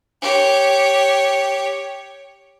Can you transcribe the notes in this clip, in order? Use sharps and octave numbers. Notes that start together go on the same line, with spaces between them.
G4 C#5